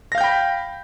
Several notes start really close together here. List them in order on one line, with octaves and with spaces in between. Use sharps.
A#6 F5 G6 G5 B5